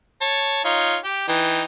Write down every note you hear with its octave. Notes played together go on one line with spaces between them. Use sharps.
C#5 A5
D#4 F4 C#5
G4 G5
E3 D#4 G5